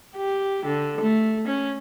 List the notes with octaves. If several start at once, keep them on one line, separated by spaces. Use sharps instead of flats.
G4
D3
A3
C#4